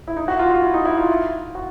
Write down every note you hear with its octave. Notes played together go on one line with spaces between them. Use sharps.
E4
D#4
F#4
F4
F4
E4
D#4
E4
F4
F#4